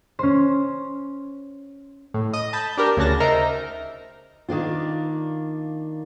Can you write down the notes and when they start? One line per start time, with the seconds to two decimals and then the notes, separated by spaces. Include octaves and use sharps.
0.19 C#4 C5
2.14 A2
2.33 D#5 D#6
2.53 A5 B5 G6
2.77 D4 G4 A#4
2.97 D2 C#3 C#4 F#4 A5 A#6
3.20 D#4 A#4 C5 E5 A#5
4.48 D#3 A#3 D4 F4